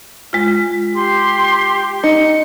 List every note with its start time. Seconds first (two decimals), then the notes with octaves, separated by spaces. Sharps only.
0.33 G#3 F4
0.95 G4 C6
2.03 D#4 C#7